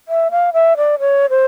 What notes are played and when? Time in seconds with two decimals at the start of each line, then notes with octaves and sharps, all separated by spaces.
0.08 E5
0.31 F5
0.53 E5
0.77 D5
1.00 C#5
1.30 C5